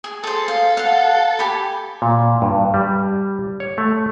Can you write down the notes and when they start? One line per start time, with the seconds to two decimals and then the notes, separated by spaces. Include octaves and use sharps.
0.04 G#4
0.24 G#4 A4 C5
0.48 F5
0.77 F5 F#5
1.39 G4 G#5 B5
2.02 A#2
2.42 G2
2.74 G3
3.60 C#5
3.78 A3